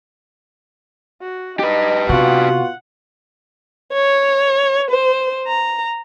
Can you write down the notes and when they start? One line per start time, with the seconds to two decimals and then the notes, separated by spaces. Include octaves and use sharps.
1.22 F#4
1.59 D#4 G4 B4
2.09 C3 B3 F4 F#4 F#5
3.93 C#5
4.91 C5
5.47 A#5